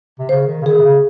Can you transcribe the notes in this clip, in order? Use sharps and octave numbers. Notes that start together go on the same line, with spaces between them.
C3
C#3 C5
D#3
C#3
D#3 G#4
C3
C#3